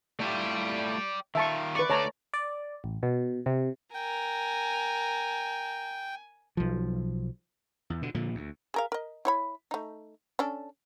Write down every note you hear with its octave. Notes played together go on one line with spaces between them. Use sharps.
A3 E4 F4 D5 G5
D#3 F4 E5 A5 C#6
B4 D5 C#6
D3 A3 C#5 A5 A#5
D5
A1
B2
C3
A#4 G5 G#5
B1 F3
E2
B2 D3
A#2 D3 F3
D2
G#4 A#4 F5
A#4 D#5
E4 C#5 B5
A3 D#4
C#4 D4 A4